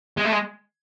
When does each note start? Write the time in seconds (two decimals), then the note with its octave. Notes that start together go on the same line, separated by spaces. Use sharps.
0.17 G#3
0.25 A3
0.32 G#3